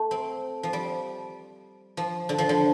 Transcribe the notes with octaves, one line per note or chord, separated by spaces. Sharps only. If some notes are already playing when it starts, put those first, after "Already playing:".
Already playing: A3
C4
F3
G3
F3
D3
F3
D3